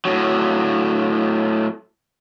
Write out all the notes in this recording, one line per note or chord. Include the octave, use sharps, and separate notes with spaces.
A2 F#3